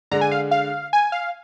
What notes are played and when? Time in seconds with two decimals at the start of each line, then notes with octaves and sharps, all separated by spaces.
0.11 D3 G#3 D4 A#5
0.21 G#5
0.32 F5
0.51 F5
0.93 G#5
1.12 F5